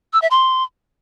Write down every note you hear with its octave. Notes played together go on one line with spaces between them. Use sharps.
E6
E5
C6